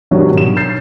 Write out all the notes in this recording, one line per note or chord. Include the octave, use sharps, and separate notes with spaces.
C3 D#3 F#3 C#4 D4
B2 E7
G6 A6 C7